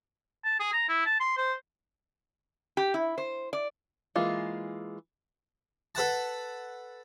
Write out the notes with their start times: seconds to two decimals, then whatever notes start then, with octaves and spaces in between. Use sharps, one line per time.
0.44 A5
0.60 G#4
0.73 A#5
0.89 E4
1.06 A5
1.20 C6
1.37 C5
2.77 G4
2.94 E4
3.18 C5
3.53 D5
4.16 E3 G#3 A#3 F4
5.95 A4 B4 F#5 A5